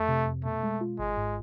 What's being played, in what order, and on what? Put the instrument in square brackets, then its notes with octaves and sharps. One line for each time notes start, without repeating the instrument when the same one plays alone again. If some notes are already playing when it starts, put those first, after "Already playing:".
Already playing: [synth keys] F2 [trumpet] A3
[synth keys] C3
F2
[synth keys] B2 [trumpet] A3
[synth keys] G#3
F4
[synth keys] G#1 [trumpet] G#3
[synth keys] G#2